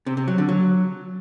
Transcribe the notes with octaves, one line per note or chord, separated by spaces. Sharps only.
C3
C3
F#3
D3
F#3